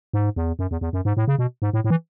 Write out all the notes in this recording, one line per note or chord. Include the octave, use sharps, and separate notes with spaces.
G#2
E2
F#2
E2
E2
F#2
G#2
A2
C#3
B2
G#2
A2
A2
E3